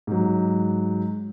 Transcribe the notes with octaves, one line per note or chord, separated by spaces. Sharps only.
G#2 F#3